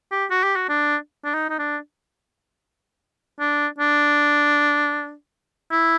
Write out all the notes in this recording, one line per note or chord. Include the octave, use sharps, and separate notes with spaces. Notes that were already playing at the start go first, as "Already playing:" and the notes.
G4
F#4
G4
F#4
D4
D4
D#4
D#4
D4
D4
D4
E4